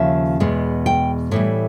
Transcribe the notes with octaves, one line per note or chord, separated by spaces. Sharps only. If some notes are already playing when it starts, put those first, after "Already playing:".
Already playing: D#2 C#3 F3 E5
E2 B2 G#3
G5
A2 E3 G3